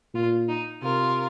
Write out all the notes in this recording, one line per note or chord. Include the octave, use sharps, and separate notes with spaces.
A#2 F4
D#4
C3 F4 A#4